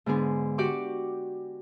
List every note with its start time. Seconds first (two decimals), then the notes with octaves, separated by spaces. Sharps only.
0.06 G#2 D3 B3 G#4
0.58 F#4 G4 D5 G5 C#6 D6